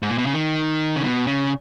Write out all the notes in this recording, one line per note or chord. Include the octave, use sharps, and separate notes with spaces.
G#2
A#2
B2
C#3
D#3
C#3
B2
C#3